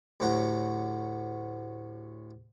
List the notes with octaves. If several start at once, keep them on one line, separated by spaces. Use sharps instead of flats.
D2 A2 F#3 G4 F#5 A#5